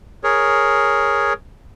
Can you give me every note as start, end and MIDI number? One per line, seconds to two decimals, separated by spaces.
0.24 1.33 68
0.24 1.33 70
0.24 1.33 73